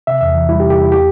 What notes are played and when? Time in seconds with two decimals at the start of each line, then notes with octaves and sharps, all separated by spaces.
0.07 C3 E5
0.21 E2 E5
0.35 E3
0.49 G3 E4
0.60 G4
0.63 C3
0.70 G4
0.78 E2 E4
0.91 A3 G4